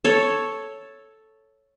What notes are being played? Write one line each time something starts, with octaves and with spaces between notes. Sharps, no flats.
A4 C#5